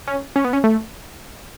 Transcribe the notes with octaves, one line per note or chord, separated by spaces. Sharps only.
C#4
C#4
B3
C#4
A3